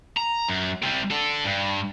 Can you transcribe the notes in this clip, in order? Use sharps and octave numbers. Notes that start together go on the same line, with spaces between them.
A#5
F#2
C3 G3
D4 A4
G2